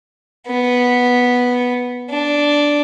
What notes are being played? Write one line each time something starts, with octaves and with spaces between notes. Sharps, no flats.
B3
D4